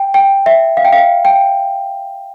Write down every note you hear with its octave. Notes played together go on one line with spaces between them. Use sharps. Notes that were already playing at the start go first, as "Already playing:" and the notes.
Already playing: G5
G5
E5
F5
G5
F5
G5